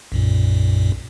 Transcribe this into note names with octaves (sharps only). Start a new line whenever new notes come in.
B1 F#2 A#2